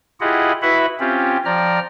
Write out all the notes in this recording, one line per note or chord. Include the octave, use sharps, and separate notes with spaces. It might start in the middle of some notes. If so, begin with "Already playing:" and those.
E4 F4 G4 G#4 D#5 F#5
E4 F#4 B4 E5 F#5 B5
C4 C#4 F4 G4
F3 D5 G5 A#5 F6